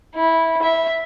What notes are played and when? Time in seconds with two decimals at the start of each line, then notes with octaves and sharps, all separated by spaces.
0.15 E4
0.62 E5